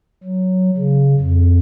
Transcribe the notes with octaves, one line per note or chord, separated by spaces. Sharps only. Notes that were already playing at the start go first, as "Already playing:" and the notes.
F#3
C#3
F2